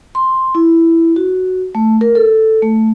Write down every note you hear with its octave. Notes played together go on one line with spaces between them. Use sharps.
C6
E4
F#4
A3
A#4
A4
A3